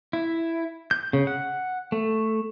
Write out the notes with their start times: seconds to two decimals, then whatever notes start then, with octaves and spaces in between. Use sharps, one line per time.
0.13 E4
0.91 G6
1.13 C#3
1.27 F#5
1.92 A3